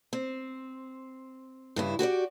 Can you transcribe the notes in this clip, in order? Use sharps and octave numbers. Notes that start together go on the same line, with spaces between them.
C4
G2 C#3 E4
F#4 G4 B4 D5